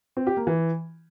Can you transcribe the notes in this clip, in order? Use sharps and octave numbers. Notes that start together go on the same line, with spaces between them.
C4
G4
A#3
E3